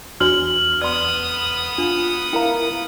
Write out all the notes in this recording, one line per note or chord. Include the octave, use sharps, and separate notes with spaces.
E2 D4 F#4 C#5 F6 F#7
B3 D5 C6 D#6 F6
D4 F4
E4 A#4 F5 G5 A#5